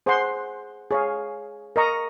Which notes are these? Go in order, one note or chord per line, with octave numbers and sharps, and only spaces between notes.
G#4 C5 F#5 C6
G#4 C#5 F5
A#4 D#5 A#5 C#6